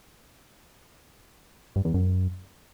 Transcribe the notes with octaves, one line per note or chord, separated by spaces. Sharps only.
G2
E2
F#2